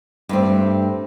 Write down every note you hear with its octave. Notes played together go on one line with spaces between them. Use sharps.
G2 A3 C4